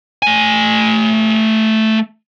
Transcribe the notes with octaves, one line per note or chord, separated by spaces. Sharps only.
A3 G#5